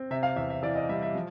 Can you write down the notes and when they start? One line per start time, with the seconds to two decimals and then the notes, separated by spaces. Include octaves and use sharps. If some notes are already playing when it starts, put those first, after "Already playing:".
Already playing: C4
0.11 C3 E5
0.23 F5
0.36 E2 E5
0.50 E5
0.63 E3 D5
0.76 D#5
0.89 G3 E5
1.02 E5
1.15 F3